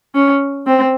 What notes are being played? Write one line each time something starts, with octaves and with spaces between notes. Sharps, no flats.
C#4
C4